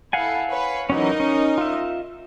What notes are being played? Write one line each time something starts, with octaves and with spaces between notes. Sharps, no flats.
E4 A4 F5 F#5 G#5
B4 C#5
E3 F#3 C#4 D#4 A#4 D#5
C#4
F4 E5